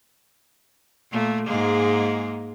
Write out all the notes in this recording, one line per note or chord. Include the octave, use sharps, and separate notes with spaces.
A#2 A3 A#3
G#2 G#3 A#3